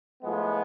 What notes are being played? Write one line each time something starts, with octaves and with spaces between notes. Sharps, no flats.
A2 F3 G#3 B3